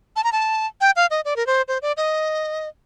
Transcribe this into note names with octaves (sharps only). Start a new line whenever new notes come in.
A5
A#5
A5
G5
F5
D#5
D5
A#4
C5
C5
D5
D#5